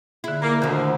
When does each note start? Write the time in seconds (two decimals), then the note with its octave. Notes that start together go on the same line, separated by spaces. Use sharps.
0.24 D3 E4 G#4
0.42 A#3 D6
0.62 D2 D3 D#3 F3